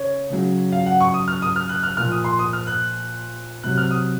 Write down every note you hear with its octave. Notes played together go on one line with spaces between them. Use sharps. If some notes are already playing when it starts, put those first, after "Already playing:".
Already playing: C#3 C#5
C#3 F#3
F5
F#5
C#6
D#6
F6
D#6
F6
F#6
F6
A#2 F3 F6
D#6
C6
D#6
F6
F#6
C3 F#3 F#6
F6
D#6